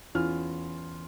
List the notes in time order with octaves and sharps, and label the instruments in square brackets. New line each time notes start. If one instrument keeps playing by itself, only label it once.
[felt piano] E2 C#4 F4 F6